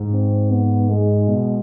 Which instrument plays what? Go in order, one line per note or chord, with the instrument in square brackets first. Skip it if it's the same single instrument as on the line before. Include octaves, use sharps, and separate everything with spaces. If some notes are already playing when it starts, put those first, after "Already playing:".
Already playing: [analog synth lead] G#2
[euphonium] C4
B3
G#3
[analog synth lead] B2